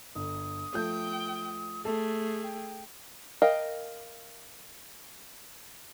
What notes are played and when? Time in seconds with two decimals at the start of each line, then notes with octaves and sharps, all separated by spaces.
0.15 G1 D#6
0.74 F3 A3 G5 G6
1.85 A3 G#4 A4
2.43 G5
3.42 A#4 D#5 F5 G5